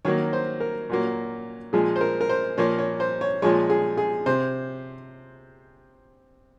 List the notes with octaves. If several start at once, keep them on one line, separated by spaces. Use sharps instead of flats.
D#3 F#3 A#3 C#5
C5
A#4
A#2 F#3 A#3
A#2 F3 G#3 G#4
C5
A#4
A#4
C5
A#2 F3 A#3 C#5
C#5
C5
C#5
A#2 F3 G#3 C#5
G#4
G#4
C3 C5